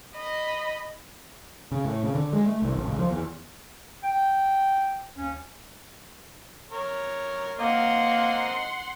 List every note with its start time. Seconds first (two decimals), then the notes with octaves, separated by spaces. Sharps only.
0.15 D#5 B5
1.72 C#3
1.85 A2
2.03 C#3
2.15 D3
2.33 G#3
2.46 A3
2.62 C2
2.74 A1
2.87 C#2
2.99 F3
3.10 E2
4.03 G5
5.17 D#2 C#4
6.72 A#4 C#5
7.60 A#3 C4 A#4 D#5 F#5 C6